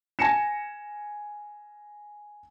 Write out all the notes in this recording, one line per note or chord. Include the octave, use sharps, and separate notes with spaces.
G#5 G#6 A#6 C#7 E7